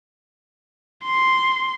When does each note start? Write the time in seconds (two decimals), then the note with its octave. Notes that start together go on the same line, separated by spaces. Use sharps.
1.04 C6